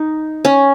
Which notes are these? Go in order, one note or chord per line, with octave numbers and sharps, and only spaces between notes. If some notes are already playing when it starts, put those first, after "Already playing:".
Already playing: D#4
C#4